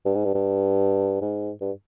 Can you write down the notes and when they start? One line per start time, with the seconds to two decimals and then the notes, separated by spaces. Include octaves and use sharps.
0.05 G2
0.15 G#2
0.25 G2
0.35 G2
1.21 G#2
1.61 G2